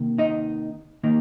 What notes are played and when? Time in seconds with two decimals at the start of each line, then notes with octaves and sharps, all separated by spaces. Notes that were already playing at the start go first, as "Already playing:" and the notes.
Already playing: C3 D#3 A#3
0.18 D#4 D#5
1.03 D#3 A#3 D#4